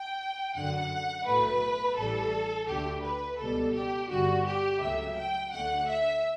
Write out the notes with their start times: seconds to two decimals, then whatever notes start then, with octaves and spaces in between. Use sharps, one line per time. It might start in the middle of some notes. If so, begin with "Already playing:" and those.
Already playing: G5
0.55 F#2 D3 F#3 F#5
1.26 B1 A2 F#3 A3 B4
1.96 A1 A2 E3 G3 A4
2.68 D2 D3 A3 G4
3.03 B4
3.39 C#2 B2 G3 A4
3.74 G4
4.10 G1 G2 D3 G3 F#4
4.45 G4
4.80 C#2 C#3 F#3 A3 E5
5.16 G5
5.52 D2 D3 A3 F#5
5.87 E5